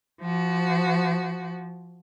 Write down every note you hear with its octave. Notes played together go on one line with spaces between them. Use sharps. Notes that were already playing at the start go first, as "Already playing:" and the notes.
F3 F#4